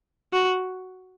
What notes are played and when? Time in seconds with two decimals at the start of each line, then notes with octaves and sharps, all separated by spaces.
0.33 F#4